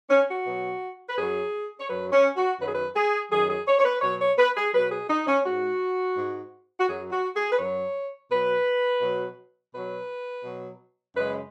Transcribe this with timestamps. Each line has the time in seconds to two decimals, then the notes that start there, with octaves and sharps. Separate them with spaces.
0.10 C#4
0.28 F#4
0.45 B2 F#3
1.09 B4
1.17 F#2 F#3 G#4
1.79 C#5
1.88 F#2 F#3 B4
2.12 C#4
2.36 F#4
2.60 F#2 D#3 F#3 B4
2.67 G#4
2.74 B4
2.95 G#4
3.31 F#2 D#3 F#3 G#4
3.48 G#4
3.67 C#5
3.79 C#5
3.84 B4
4.02 B2 F#3 C#5
4.20 C#5
4.37 B4
4.56 G#4
4.73 B2 F#3 B4
4.91 G#4
5.09 D#4
5.27 C#4
5.45 G#2 G#3 F#4
6.16 G#2 G#3
6.79 F#4
6.87 F#2 F#3 G#4
7.11 F#4
7.35 G#4
7.51 B4
7.59 F#2 F#3 C#5
8.30 B2 F#3 B4
9.01 B2 F#3
9.73 B2 F#3 B4
10.44 B2 F#3
11.15 F#2 C#3 G#3 B4